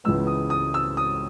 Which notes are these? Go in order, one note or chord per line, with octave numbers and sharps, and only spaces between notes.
C#2 C#3 E3 G#3 B3 E6
D#6
D#6
E6
D#6